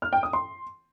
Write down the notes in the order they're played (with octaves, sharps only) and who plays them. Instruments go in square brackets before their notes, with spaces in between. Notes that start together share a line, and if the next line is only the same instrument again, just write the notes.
[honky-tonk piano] F6
G5
D#6
C6